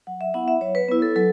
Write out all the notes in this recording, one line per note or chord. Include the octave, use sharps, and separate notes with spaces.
F#3 F#5
E5
B3 E4 F#5
E5
F#3 C#5
B4
B3 E4
A4
F#3 A4